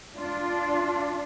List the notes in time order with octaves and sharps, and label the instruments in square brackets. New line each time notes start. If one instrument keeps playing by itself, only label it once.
[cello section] D4 F4